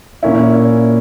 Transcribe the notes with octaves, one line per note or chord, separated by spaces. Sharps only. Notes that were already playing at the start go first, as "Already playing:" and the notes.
A#2 A#3 C#4 E4